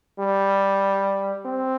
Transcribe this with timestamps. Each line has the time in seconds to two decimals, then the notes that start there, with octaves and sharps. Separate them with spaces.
0.19 G3
1.46 C4